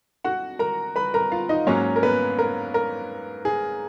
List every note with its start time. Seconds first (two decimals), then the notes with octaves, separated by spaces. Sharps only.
0.24 F#4 F#5
0.59 A#4 A#5
0.96 B4 B5
1.14 A#4 A#5
1.32 F4 F5
1.49 D#4 D#5
1.67 G#2 F#3 A#3 C#4 C#5
1.96 A#4
2.03 B3 B4
2.39 A#4
2.74 A#4
3.45 G#4